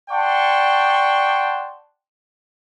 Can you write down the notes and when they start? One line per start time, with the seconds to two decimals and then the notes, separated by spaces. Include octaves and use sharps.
0.10 D5 F#5 G5 A5 C6 C#6